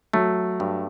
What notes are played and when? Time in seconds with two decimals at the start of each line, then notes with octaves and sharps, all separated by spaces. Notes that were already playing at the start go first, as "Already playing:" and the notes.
0.13 F#3 A3
0.60 G2